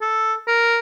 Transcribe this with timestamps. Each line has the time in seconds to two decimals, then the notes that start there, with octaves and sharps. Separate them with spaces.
0.01 A4
0.47 A#4